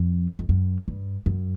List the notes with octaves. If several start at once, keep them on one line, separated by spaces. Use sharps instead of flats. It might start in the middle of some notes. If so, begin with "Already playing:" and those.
Already playing: F2
F2
F#2
G2
F#2